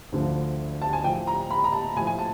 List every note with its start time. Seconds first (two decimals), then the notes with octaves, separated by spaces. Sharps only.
0.12 D2 D3 F3
0.82 A5
0.93 G#5
1.04 A2 F3 G5
1.27 A#5
1.50 B5
1.64 A#5
1.73 A5
1.96 A2 F3 G#5
2.07 G#5
2.18 A5